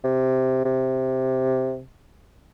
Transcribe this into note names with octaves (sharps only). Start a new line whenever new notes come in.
C3
C3